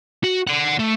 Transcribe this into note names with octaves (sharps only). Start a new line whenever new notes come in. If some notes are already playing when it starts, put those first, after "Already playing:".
F#4
D5 F#5
A3